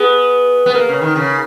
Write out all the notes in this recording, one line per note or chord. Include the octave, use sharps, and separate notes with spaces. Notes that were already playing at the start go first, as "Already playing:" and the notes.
Already playing: B3 G#4
B3
A#3 A#4
C#3
D#3
C#3